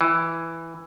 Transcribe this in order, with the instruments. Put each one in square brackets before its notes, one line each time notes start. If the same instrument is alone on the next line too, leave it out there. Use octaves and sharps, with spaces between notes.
[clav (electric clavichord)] E3